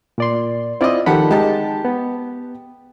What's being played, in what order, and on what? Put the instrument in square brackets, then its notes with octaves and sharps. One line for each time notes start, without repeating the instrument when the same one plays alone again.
[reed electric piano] A#2 D5 C6
[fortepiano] C4 D#5 [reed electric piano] E4 F4 D5
[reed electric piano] D#3 F3 B5 [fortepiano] G4 A4 F#5
[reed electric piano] G#3 D#4 [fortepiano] G4 A5
[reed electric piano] B3